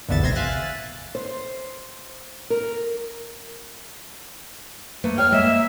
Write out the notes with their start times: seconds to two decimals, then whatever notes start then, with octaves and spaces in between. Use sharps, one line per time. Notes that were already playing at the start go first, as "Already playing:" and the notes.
0.09 A#1 E2 D3 B3 E5 A6
0.21 G#1 D#2 C3 C6 G#6 A#6
0.35 E5 F5 G#5 F#6 A6
1.15 C5
2.50 A#4
5.04 A3 A#3 B4
5.18 C#5 G5 F6
5.32 G#3 A#3 D#5 E5